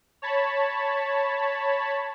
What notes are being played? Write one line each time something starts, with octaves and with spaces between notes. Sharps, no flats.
C#5 A5 B5